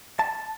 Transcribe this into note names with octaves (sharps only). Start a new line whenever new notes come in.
A5